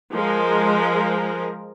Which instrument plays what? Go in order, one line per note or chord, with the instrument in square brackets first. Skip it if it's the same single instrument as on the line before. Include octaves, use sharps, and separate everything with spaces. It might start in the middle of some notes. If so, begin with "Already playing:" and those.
[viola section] F3 G#3 A#4